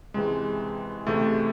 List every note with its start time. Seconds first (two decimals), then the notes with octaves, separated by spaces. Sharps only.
0.14 C#2 C3 E3 G#3
1.06 C#2 C3 E3 A3